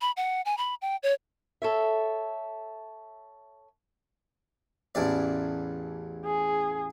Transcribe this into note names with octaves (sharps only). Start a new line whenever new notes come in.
B5
F#5
G#5
B5
G5
C#5
A4 C#5 E5
A1 E2 D5
G#4